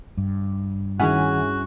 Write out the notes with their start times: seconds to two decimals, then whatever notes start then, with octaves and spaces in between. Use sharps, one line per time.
0.18 G2
1.00 D#3 C#4 E4 F#4 G#4 F#5